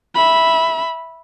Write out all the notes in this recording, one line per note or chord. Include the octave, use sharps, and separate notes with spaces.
E5 B5